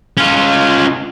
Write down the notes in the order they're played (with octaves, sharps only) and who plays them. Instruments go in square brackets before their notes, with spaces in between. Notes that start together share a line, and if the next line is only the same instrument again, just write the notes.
[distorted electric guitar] C#4 F4